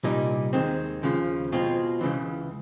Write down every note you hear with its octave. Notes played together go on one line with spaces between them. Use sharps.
C2 A#2 G3 A#3 D#4
D#2 D#3 G#3 C4
D#2 C#3 F3
B2 G#3 C4 F4
C#2 C#3 E3